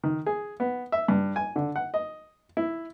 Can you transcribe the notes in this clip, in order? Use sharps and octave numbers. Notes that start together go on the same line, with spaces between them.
D#3
G#4
B3
E5
G2
G#5
D3
F#5
D#5
E4